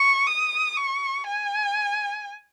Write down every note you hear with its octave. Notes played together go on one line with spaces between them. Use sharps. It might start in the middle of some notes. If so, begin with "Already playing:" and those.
Already playing: C#6
D#6
C#6
G#5